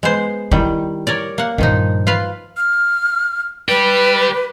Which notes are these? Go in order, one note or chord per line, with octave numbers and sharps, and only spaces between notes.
G#3 B3 C5
D#3 G3 E4
A#4 C#5 D5
A#3 F#5
G2 A#2 D#3 F3 D#4
F4 B4 F5
F6
G4 B4 D5